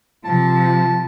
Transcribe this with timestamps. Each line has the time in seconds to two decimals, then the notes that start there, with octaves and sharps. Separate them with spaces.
0.24 C3 F3 A5